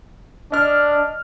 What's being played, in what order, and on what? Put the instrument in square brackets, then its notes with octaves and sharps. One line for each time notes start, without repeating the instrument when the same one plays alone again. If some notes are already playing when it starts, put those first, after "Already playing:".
[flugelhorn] D4 [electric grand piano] D#5 F6